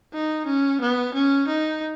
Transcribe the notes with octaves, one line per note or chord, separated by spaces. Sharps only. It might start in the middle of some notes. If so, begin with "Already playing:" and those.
D#4
C#4
B3
C#4
D#4